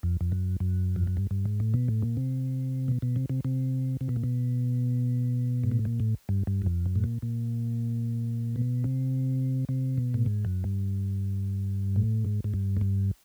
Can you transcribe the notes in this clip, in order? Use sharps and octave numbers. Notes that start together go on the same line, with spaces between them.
F2
F2
F#2
F#2
F2
F#2
G2
G2
G#2
A2
B2
A2
A#2
C3
B2
B2
C3
C3
C3
C3
B2
A#2
B2
G#2
A2
A#2
A2
G2
G2
F#2
F2
F#2
A2
A#2
A#2
B2
C3
C3
B2
A2
G#2
F#2
G2
A2
G#2
G#2
G2
G#2
G2